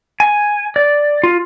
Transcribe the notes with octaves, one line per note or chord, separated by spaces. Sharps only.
G#5
D5
F4